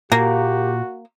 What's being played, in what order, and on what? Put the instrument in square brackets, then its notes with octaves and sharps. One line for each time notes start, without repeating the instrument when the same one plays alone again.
[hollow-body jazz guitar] A#2 [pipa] A#3 [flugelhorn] F#4 [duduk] G4